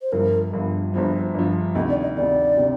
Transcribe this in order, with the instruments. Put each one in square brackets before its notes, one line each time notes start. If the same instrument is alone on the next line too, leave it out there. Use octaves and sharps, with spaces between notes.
[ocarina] C5
[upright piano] G1 G2 F3 [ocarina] A#4
[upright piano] G1 G2 F3
[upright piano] G1 G2 F3 [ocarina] C5
[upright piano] G1 G2 F3
[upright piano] D2 C3 D#3 [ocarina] D#5
[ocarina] D5
D#5
[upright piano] D2 C3 D#3 [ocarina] D5
[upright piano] C3 D#3